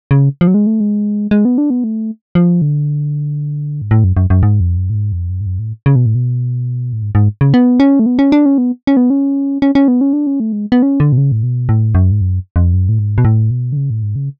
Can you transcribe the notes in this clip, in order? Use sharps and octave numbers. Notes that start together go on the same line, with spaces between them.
C#3
F3
F#3
G#3
A3
G#3
G#3
B3
D4
B3
A3
F3
D3
G#2
A2
F#2
F#2
F#2
G#2
F2
F#2
A2
G#2
F2
F#2
G#2
F#2
A2
C#3
B2
A2
B2
A2
G#2
G#2
C#3
B3
C#4
A3
B3
C#4
D4
C#4
B3
C#4
B3
C#4
C#4
C#4
B3
C#4
D4
C#4
A3
G#3
B3
C#4
D3
B2
C#3
A2
B2
A2
F#2
G#2
F#2
F2
F#2
A2
G#2
B2
A2
B2
D3
C#3
A2
G#2
C#3